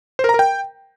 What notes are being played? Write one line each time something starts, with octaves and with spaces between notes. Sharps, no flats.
C5
A#4
A#5
A#4
G5